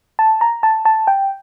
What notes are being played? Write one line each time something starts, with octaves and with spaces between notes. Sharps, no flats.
A5
A#5
A5
A5
G5